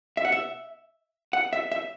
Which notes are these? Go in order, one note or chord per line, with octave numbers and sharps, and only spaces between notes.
E5
F#5
E5
F#5
E5
E5